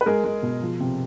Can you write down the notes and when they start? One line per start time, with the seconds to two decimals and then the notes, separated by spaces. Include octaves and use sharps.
0.01 B4
0.06 G#3 G#4 A#4
0.24 G#3
0.43 B2
0.62 F3
0.80 C3